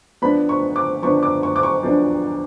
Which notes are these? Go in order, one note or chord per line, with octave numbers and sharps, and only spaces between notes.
F3 B3 D4 B5
C#6
D6
F3 B3 D4 C#6
D6
C#6
D6
C#6
F3 B3 D4